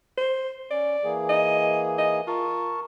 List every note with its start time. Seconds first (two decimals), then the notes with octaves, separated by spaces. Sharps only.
0.18 C5
0.71 C#4 D5
1.04 E3 A#3 G#4
1.30 D#5
1.99 D#5
2.28 F4 A#4 A5 C#6